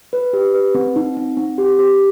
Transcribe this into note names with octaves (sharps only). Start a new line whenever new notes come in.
B4
G4
B4
C4
D#4
C4
C4
G4
G4